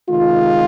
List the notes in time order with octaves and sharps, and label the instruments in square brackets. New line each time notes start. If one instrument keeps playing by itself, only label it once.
[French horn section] C3 D#3 G#3 F4